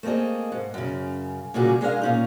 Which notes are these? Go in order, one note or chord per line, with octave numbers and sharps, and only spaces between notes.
A3 A#3 C4 G#4 D#5
G#2
F#2 C#3
A#2 C#3 G3 A#3 F#4 G#4
G#3 D4 G#4 A#4 D5 F5
A#2 C#4 D#4